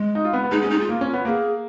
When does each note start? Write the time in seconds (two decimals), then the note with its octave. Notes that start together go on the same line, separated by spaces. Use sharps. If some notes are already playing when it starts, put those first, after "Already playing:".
Already playing: G#3
0.15 D#4
0.25 F4
0.33 B3
0.43 B3
0.52 G#3 D#4
0.62 G#3 C#4
0.70 D#4
0.76 G#3
0.80 F4
0.89 A#3
1.01 C#4
1.13 B3
1.25 A#3 G#4